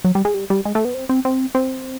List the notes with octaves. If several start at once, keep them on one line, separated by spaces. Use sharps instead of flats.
F#3
G3
G#3
G3
G3
G#3
A3
B3
C4
C4
C4
C4